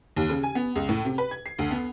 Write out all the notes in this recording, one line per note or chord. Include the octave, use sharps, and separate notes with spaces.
D#2
C#3
G#5
B3
C#2
A2
C3
B4
G#6
C7
D2
B3